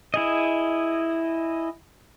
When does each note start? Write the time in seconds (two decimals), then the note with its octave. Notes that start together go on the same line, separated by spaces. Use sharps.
0.14 E4 G#4 D#5